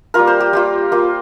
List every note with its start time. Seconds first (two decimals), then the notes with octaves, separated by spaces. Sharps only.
0.14 G3 A#3 F4 A#4
0.27 C5
0.40 G4
0.53 G3 A#3 F4 G4
0.92 A#3 F4